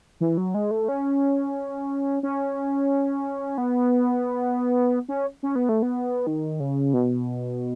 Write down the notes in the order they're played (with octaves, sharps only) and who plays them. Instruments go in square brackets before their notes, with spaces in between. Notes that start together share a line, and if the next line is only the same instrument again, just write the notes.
[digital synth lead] E3
F#3
G#3
A3
C#4
C#4
B3
C#4
C#4
B3
A3
B3
D#3
C#3
B2